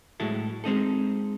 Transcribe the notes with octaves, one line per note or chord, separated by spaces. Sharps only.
A2 F#3 G#3 E4 A4
G#3 C4 D#4 A4